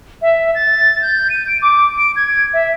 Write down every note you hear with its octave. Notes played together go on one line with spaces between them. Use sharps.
E5
A6
G6
D#7
D7
D6
D7
G#6
E5